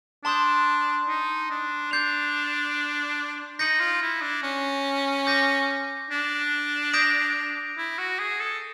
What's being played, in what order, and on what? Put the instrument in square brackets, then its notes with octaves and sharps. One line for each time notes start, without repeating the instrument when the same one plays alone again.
[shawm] D4 [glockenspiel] A5 C6 D#6 G6
[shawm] D#4
D4
[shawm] D4 [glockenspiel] G6 C7 F7
[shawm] D#4 [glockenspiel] G6 A#6 C#7 F#7
[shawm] F4
E4
D4
C#4
[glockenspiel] D6 G6 A#6
[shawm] D4
[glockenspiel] D#6 G6 A#6 D7 F7
[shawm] E4
F#4
G#4
A4